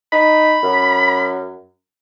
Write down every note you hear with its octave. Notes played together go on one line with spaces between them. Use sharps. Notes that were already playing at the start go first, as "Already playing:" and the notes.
D#4 B5
F#2